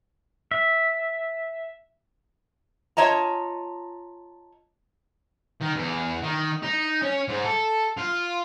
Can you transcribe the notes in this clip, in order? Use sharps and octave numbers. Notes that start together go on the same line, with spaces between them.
E5
F4 C#5 D#5 A5 A#5
D#3
E2
D#3
D#4
C#4
G#2
A4
F4